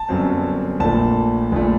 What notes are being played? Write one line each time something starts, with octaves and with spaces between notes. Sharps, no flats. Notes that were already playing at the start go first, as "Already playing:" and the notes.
Already playing: A5
G1 F#2 F#3 C4
A#1 A#2 A3 A5
A#1 A#2 A3